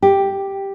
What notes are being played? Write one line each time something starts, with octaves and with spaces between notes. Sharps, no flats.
G4